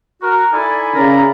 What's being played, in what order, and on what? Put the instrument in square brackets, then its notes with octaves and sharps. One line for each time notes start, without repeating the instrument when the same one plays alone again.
[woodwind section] F#4 [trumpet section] A#4
[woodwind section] D#4 A4 G#5 [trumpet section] E4 D5 B5
[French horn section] C#3 [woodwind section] A#4 A#5